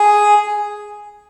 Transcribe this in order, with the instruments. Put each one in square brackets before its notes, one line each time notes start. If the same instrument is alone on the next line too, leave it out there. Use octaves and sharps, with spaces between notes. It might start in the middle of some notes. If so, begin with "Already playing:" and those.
Already playing: [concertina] G#4